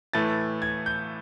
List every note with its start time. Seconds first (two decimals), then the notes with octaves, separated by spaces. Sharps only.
0.13 A2 E3 A3 A6
0.62 G#6
0.86 G6